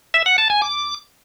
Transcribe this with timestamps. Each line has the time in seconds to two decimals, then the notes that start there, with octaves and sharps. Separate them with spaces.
0.14 E5
0.26 F#5
0.38 A5
0.50 G#5
0.62 D6